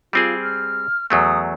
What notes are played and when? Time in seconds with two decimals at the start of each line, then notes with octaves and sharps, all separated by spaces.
0.13 G3 C4 F4 G#4
0.42 F6
1.10 E2 F#3 A3 D#6